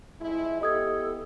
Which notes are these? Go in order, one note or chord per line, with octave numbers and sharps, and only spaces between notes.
F2 G#3 E4
B3 E4 G4 A4 D#5 D#6 G#6